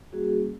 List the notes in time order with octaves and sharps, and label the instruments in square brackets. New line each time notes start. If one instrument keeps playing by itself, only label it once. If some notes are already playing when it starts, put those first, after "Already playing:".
[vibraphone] G3 A#3 C#4 F#4 G#4